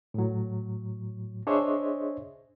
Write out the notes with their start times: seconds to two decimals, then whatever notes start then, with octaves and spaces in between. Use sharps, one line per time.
0.14 A2 F#3
1.47 D4 G#4 C5 C#5 D#5 E5